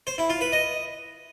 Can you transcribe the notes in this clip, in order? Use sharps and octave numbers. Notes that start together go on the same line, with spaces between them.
C5
E4
F4
B4
D#5